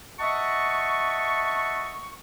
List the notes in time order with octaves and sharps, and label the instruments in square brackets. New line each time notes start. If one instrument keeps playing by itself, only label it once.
[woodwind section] D#5 E5 F#5 A5 C#6